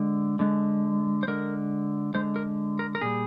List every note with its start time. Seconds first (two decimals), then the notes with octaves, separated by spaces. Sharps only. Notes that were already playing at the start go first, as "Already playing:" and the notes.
Already playing: D3 G#3
0.39 D3 G#3
1.23 C5
1.28 D3 G#3 A#4
2.14 D3 G#3 C5
2.36 A#4
2.79 A#4
2.95 A#4
3.01 A#2 G3 G#4